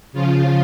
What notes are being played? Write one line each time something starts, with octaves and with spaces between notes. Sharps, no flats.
C#3 F3 F4